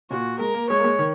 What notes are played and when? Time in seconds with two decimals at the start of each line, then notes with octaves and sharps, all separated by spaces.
0.11 A#2 F#4
0.39 G#3 A#4
0.54 A#3
0.69 G#3 C#5
0.79 A#3
0.84 G#3
0.99 D#3